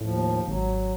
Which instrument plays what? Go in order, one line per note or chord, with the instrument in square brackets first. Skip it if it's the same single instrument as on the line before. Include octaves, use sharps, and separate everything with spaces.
[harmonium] D#2 F3 [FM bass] A2
[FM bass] G#1 [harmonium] F#3